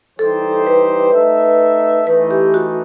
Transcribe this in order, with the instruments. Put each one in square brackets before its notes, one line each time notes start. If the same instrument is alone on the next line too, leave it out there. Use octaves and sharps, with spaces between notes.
[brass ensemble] E3 G3 D#4 G4 C5 [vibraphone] A4
[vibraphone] B4
[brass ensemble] A3 D#4 A4 E5
[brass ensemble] E3 A3 D#4 [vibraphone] B4
[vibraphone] G4
F#4